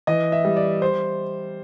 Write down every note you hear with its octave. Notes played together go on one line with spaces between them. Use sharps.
E3 D#5
E5
G3
D5
C5